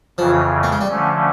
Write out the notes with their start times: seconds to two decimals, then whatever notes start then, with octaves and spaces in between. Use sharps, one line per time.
0.18 F2 C#3 E3 F3
0.63 A3
0.72 G#3
0.81 G3
0.89 D3 F3 A3 C#4